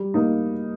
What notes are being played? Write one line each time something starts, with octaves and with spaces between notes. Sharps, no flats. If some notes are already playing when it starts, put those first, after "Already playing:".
Already playing: G3
A#3 D#4